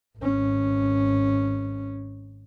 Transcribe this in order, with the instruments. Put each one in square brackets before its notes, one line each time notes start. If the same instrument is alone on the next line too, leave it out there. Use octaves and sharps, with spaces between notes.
[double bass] G#1 C#4